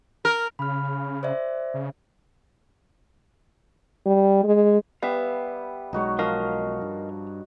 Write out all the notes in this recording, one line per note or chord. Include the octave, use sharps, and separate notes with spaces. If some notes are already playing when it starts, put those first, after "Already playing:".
A#4
C#3 B5 F6
C5 D5 E5
C#3
G3
G#3
G3 B3 E5 F5
B1 G#3 D#4 F#4 C#5
F3 A#4 D#5 F5
G2